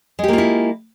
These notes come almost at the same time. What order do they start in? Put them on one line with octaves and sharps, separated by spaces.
G#3 G4 A#3 F4 E4